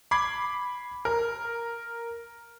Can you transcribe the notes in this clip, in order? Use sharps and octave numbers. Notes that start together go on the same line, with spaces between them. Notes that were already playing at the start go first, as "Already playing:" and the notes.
B5 D6 G#6 C7
A#4